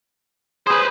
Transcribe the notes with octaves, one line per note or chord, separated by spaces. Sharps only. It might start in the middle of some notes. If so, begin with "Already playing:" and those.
G#4 B4 C5